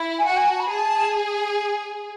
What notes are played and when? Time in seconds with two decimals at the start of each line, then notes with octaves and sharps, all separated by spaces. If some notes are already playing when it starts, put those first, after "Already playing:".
Already playing: E4
0.19 G#5
0.25 F#4 F#5
0.36 G#5
0.48 A5
0.59 B5
0.70 G#4 A5